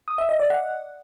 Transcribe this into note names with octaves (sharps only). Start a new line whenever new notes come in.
D#6
E5
D#5
D5
F#5